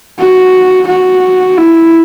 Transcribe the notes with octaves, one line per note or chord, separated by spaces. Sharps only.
F#4
F#4
E4